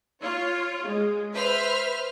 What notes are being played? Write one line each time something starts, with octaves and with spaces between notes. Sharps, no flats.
F4 C#5
G#3
B4 C5 E5 F6